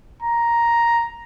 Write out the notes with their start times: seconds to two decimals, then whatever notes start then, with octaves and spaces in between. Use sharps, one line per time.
0.22 A#5